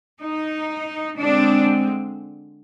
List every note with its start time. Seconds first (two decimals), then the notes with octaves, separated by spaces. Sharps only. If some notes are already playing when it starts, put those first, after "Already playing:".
0.21 D#4
1.17 D3 G#3 C4 D4